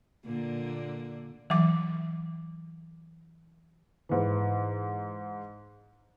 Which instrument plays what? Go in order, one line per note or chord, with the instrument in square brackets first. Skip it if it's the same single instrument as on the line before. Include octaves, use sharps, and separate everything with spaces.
[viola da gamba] A#2 D3 A#3
[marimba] E3 F#3 D6
[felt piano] G#2 E3